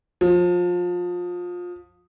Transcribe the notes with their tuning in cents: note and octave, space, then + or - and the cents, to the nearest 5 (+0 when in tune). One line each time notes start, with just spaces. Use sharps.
F3 +25